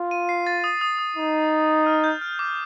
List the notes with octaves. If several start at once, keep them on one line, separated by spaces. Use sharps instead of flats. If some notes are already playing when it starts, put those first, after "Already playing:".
Already playing: F4
D#7
C7
A6
D#6
D#6
D#6
D#4
F6
G6
F6
D6